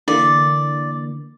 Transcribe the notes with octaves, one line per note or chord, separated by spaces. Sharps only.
D3 E3 A#3 D5